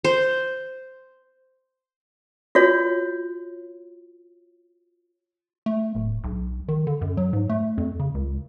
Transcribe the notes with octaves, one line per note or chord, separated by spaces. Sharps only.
C5
F4 F#4 C#5
A3
D1
B1
D#3
D3
F#2
F#3
G#2
A3
F2
C#3
C#2